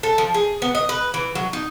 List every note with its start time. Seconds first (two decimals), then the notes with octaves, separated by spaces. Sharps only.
0.03 A4
0.18 F3
0.34 G#4
0.62 B3
0.75 D#5
0.89 B4
1.14 E3
1.35 F#3
1.53 D#4